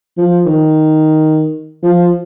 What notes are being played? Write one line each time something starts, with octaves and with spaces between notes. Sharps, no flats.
F3
D#3
F3